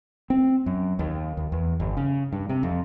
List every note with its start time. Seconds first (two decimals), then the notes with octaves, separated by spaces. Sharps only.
0.30 C4
0.66 F#2
0.99 D#2
1.37 D#2
1.52 E2
1.80 G1
1.97 C#3
2.32 G2
2.49 C3
2.63 F2